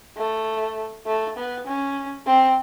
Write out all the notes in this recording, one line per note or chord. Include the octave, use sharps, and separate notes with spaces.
A3
A3
B3
C#4
C4